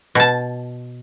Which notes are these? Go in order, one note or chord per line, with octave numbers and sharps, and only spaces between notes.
B2 A5